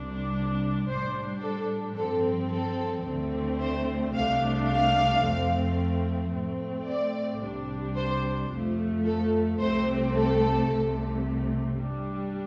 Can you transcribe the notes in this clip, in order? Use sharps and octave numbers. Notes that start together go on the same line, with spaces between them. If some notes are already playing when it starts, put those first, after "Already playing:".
Already playing: C2 C3 G3 D4
A2 G3 D4 C5
A4
G2 F3 C4 A4
A4
D2 D3 A3 C4
C5
C2 C3 A3 D4 F5
F5
F2 F3 A3 C4
A2 A3 C4
D5
C2 C3 G3 D4
C5
F2 F3 A3
A4
C2 C3 A3 C4 C5
A4
C2 C3 A3
G2 G3 D4